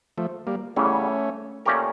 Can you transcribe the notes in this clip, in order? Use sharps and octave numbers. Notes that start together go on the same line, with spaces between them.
F3 A3
G3 A#3
E2 C#3 E3 G3 A3 C#4
A#2 A3 C#4 G4 A#4